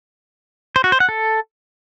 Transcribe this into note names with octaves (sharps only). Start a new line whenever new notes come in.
C5
F#4
C5
F#5
A4